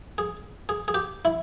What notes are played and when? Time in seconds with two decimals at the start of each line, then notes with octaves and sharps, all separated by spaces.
0.18 G#4
0.69 G#4
0.88 G#4
0.94 G4
1.25 E4